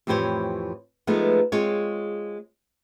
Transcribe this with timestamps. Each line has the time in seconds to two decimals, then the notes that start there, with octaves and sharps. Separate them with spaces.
0.07 F2 A2 E3 G4 C5 C#5
1.07 F3 G#3 A3 B3 D#4
1.52 G#3 C4 F4 C#5